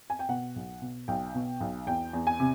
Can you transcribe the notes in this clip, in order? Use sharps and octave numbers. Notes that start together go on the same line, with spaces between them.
G#5
G5
B2 F#5
B1
B2
B1 G5
B2
B1
E2 G5
E2
G#5
C3